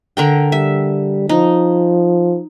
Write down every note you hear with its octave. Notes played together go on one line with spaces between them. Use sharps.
D3 A#4 G5
G3 E5
F3 D#4